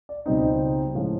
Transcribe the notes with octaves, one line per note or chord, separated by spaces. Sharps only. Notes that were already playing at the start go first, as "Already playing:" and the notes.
D5
C#2 B2 G3 C4 D#4 D#5
A2 F3 G#3 C#4